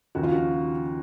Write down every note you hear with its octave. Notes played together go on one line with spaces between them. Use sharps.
D#2 C#3 F3 F#4
F4
F#4